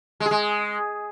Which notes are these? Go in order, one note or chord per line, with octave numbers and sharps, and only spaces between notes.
G#3
G#4
G#3